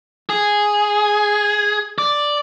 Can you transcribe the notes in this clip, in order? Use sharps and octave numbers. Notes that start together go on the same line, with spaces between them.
G#4
D5